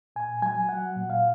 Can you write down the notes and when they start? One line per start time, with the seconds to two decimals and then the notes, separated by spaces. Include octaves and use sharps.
0.16 A#2 G#5
0.42 F#3 G#5
0.69 F#3 F#5
0.96 A#2
1.10 F5